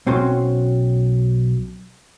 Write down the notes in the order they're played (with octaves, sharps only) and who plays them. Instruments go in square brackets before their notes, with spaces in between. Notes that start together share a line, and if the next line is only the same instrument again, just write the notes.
[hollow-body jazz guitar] B1 C4 C#4 F#4 C6